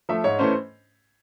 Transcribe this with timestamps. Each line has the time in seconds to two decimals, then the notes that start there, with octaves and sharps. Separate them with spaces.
0.09 F3 A3 E5
0.24 G#2 C#5
0.39 E3 A3 C#4 C5